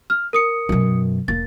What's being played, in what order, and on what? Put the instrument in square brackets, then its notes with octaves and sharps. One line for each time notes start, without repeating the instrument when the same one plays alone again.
[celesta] F6
A#4 D#6 C#7
[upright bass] F#2 B2
[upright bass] E1 A#3 [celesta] A6